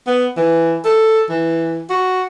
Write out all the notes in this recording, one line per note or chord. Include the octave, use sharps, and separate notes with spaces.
B3
E3
A4
E3
F#4